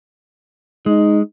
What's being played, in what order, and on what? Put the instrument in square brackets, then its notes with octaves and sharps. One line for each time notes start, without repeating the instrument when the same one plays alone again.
[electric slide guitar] G#3 [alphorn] D#4